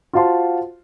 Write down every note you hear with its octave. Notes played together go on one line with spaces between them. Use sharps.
F4 F#4 C5 F5 A5 C6